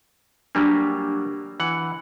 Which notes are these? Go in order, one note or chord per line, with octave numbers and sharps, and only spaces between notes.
F#3 G3 A#3 D4
E3 F#5